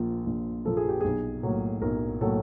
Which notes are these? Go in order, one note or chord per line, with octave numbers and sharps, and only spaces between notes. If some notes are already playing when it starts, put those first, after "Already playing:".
Already playing: A#1 A#2 F3 A#3 F4
A#1
A#2 F3 A#3 A4
G#4
G4
B1 G#4
A2 F#3 A#3
B1 A#4
A2 F#3 A#3 A4